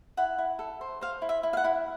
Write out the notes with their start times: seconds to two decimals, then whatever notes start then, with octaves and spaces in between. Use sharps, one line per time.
0.17 E4 F#5
0.38 E4
0.59 A4
0.81 C5
1.01 C5 F5
1.22 E4
1.29 E5
1.43 E4
1.53 F5
1.57 F#5
1.64 E4